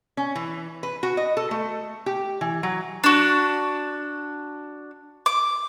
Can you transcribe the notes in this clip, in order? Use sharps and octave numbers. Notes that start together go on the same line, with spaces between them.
C#4
E3
B4
F#4
D#5
A4
A3
G4
E3
F#3
D4 F#4
D6